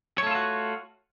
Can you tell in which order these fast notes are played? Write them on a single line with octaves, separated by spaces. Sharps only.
C#5 A3 F4 A4 F#4